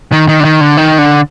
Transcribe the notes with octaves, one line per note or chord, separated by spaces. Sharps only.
D#3
D#3
D3
D#3
D3
D#3
D3